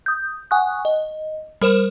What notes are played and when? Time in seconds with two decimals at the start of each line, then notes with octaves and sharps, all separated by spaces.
0.06 D#6 G6
0.51 F#5 G#5 C#6 D#6 F#6
0.85 D#5
1.62 G3 A#4 C5 E7